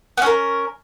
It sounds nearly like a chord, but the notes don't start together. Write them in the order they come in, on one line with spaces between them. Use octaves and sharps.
B3 C#4 A#4